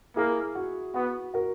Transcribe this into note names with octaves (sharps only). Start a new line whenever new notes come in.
A#3 E4 G#4
F#4
B3 F#4
F#4 A#4